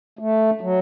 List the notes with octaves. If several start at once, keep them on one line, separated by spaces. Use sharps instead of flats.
A3
F#3